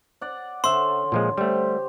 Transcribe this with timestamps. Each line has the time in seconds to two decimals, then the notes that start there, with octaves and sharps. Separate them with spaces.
0.21 D5 F#5
0.64 D3 C#4 C5 E5 C6
1.12 A#2 F3 G#3
1.38 G3 A3 G4 C5